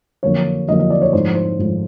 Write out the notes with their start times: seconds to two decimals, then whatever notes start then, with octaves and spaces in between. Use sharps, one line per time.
0.23 F2 D3 F#3 A#3 C#5
0.68 F2 D3 F#3 A#3 D#5
0.79 D#5
0.90 D5
1.02 C#5
1.13 G#2 F3 A3 C5
1.35 C5
1.59 G#2 F3 A3